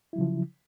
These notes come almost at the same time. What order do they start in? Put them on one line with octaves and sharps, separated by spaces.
E4 F#3 C#3 F3